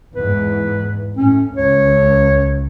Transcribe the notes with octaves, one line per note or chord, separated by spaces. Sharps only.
E2 G#2 B4
A2 C#4
C#2 C#5